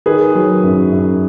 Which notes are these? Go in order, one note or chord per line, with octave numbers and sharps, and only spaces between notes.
D#3 G#4 B4
F#3
F#2
F#2